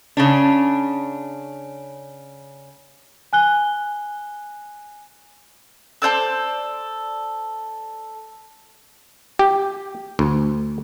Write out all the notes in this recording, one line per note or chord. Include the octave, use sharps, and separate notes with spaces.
C#3 C#4 D4
G#5 F#6 G7
A4 C5 D5 E6
G4
D2